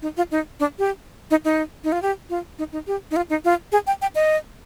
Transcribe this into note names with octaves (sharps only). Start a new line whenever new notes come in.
D#4
F4
D#4
D4
G4
D#4
D#4
D#4
F4
G4
F4
D#4
D#4
G4
D#4
F4
D#4
F4
G#4
G5
G5
D#5